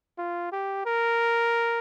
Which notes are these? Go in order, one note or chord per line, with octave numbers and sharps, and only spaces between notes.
F4
G4
A#4